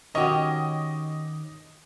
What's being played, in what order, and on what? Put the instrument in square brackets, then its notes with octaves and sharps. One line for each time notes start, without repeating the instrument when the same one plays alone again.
[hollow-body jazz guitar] D#3 C#4 F#4 [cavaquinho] G4 C#5 [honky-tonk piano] D#5